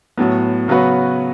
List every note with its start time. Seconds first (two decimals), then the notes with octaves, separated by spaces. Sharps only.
0.17 A2 F#3 B3
0.68 C#3 F#3 B3 F#4 B4